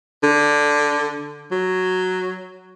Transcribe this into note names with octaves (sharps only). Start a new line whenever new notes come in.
D3
F#3